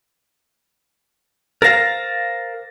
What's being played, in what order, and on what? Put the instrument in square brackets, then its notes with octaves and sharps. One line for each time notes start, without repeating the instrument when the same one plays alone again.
[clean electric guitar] A#4 C5 F5 [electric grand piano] A6 A#6